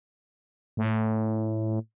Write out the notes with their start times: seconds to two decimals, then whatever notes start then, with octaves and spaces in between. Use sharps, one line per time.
0.77 A2